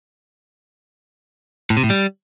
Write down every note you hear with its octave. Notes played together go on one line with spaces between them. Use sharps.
A2
C3
A2
G3